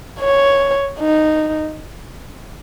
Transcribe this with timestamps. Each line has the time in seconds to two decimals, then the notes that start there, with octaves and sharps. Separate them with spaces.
0.20 C#5
0.99 D#4